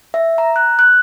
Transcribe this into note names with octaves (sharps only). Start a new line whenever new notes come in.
E5
A#5
F#6
F#6